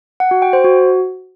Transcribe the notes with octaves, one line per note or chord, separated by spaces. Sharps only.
F#5
F#4
G5
C5
F#4